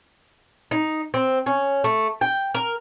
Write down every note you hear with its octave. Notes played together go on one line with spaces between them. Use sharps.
D#4
C4
C#4
A3
G5
A#4